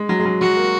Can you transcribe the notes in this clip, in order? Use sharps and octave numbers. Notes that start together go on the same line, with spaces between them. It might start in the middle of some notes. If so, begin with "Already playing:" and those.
Already playing: G#3
F#3
G#3
F#3
F#3 F#4
A#3